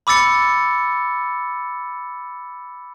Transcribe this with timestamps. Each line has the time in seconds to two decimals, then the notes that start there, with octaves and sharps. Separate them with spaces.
0.07 B5 D6 E6 A6 C#7